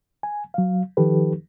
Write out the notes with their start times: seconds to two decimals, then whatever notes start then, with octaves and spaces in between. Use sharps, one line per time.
0.23 G#5
0.54 F#3 F5
0.97 D#3 F3 D#4 G4 A4 B4